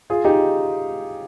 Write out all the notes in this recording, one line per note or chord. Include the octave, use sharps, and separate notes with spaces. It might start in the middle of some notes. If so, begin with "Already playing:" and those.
F4 G#4
D#4 G4